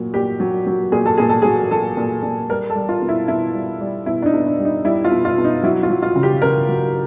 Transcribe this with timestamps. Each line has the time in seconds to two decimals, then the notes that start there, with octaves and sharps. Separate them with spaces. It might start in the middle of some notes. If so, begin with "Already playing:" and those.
Already playing: A#2 F#3
0.14 A#2 G4
0.40 F#3
0.67 F#3
0.92 A#2 G#4
1.06 A4
1.18 A#2 G#4
1.29 A4
1.42 F#3 G#4
1.71 F#3 A4
1.97 A#2
2.23 A#2
2.50 G3 A#4
2.70 A4
2.75 G3
2.89 F4
3.02 B2
3.08 E4
3.28 B2 E4
3.54 G3
3.81 G3
4.06 B2 E4
4.22 D4
4.26 D#4
4.33 B2
4.46 D4
4.59 G3
4.65 D#4
4.85 G3 E4
5.04 F4
5.11 B2
5.25 F4
5.38 B2
5.45 D#4
5.63 F#3 E4
5.83 F4
5.90 F#3
6.02 F4
6.16 C#3
6.23 G4
6.42 C#3 A#4
6.69 F#3